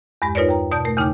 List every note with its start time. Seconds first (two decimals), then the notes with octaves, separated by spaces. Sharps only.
0.22 E2 G2 G#3 G4
0.35 D#4 F4 A#4 B4 C#5 D5
0.49 G5 A#5
0.72 B2 D5 A5 D#6 G6
0.85 A3 A#4
0.97 E2 C#3 D#4 G5 D6 F6